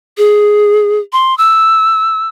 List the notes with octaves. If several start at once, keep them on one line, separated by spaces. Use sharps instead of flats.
G#4
C6
E6